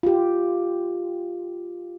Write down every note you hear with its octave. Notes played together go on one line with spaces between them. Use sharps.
F4 G4